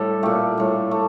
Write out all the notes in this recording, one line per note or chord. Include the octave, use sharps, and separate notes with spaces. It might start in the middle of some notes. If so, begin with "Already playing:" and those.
Already playing: A2 G3 A4
A#2 A3 G4
A2 G3
A3